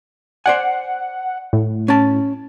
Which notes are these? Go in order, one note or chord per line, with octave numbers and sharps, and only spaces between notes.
C5 D5 F#5 G#5
A2
C#4 A5